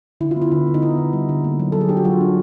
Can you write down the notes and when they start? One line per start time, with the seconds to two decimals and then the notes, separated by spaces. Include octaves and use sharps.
0.21 D3 E4
0.31 F4
0.36 B3
0.42 E4
0.52 D3
0.67 B3
0.74 D#4
0.82 B3 E4
0.98 D3
1.13 G3
1.29 D3
1.44 A#3
1.60 F#3
1.72 F#3 A4
1.81 G#4
1.89 D4 G4
1.97 F#4
2.05 F#3 F4
2.21 D4